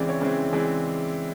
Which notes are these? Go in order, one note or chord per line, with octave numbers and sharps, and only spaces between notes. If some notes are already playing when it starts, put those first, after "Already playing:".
Already playing: C#3 E3 G#3 C4 D5
C#5
C#3 E3 G#3 C4
C#3 E3 G#3 C4